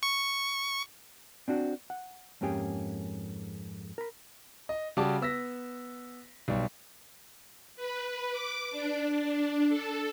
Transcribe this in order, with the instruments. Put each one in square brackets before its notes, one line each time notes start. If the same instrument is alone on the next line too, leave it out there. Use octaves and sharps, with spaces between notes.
[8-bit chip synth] C#6
[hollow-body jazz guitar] C4 D4 F#4
F#5
F2 G#2 A#3 C#4 G4 G#4
A#4 B5
[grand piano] D#5
C#3 G3 F#4 G4 A5 D6
B3 E6 A#6 B6
B1 G3
[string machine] B4
D6
D4
D4
A4